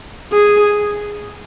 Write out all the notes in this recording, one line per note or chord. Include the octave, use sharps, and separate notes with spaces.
G#4